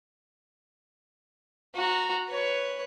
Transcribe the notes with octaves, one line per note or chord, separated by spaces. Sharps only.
F#4 A#5
B4 C#5